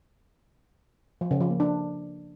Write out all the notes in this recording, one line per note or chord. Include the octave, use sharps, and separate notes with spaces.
F3
C#3
F3
A#3
D4